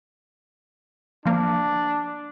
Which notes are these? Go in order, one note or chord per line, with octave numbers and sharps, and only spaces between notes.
F3 A#3 D4